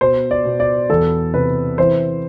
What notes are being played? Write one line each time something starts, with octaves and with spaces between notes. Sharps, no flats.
B2 C5
D5
B2
D5
E2 A4
C3 B4
E3 C5